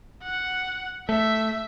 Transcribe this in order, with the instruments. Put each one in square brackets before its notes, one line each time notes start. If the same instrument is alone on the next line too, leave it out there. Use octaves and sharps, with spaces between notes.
[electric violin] F#5
[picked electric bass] A3 [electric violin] E5